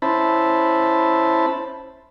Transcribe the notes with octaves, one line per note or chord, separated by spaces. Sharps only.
C#4 E4 C5 A5 B5